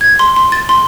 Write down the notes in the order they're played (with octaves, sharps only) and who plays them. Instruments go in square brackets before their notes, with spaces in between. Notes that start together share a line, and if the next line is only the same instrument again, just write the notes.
[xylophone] G#6
C6
C6
A6
C6